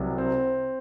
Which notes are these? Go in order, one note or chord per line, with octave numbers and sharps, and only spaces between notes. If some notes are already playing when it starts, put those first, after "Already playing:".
Already playing: C2 C3 F#3
C4